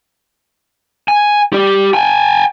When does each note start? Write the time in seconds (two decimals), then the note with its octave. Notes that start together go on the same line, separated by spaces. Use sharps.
1.08 G#5
1.53 G4 D5
1.93 G5 G#5